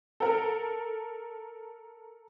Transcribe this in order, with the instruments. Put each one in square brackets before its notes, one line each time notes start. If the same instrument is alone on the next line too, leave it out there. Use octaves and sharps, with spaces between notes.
[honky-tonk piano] A4 A#4